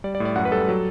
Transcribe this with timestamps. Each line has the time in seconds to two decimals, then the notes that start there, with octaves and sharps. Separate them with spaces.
0.04 G3 D5
0.15 D5
0.20 A2
0.25 D5
0.36 F#2 F#5
0.45 B4
0.52 G3 A4
0.68 F#3